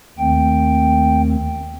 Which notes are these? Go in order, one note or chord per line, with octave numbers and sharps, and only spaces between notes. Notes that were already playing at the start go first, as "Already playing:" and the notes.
D#2 D#3 A3 C4 G5